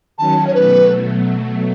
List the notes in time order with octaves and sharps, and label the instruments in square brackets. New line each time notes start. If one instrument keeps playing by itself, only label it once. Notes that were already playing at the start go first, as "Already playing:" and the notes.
[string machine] D#3 F#3 C#4 [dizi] A5
[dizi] C#5
[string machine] B2 F#3 A3 [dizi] B4